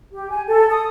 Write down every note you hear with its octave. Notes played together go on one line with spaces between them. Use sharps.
G4
G#5
A4
D#6